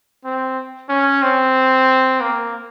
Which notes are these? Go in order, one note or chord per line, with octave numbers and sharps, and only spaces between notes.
C4
C#4
C4
A#3